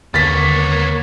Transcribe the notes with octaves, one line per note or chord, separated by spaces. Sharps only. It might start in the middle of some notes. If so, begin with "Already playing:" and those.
D#2 D3 A#3 B3 C#5 A6 B6